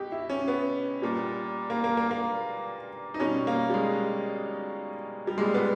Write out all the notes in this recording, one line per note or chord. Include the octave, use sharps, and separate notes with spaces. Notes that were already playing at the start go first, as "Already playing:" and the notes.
Already playing: B2 G4
E4
C#4
B3
A#2 G3
A#3
A#3
A#3
A#3
D#4
B2 G3 C#4
A#3
G3
G#3
G3
A#2 G3 G#3
B3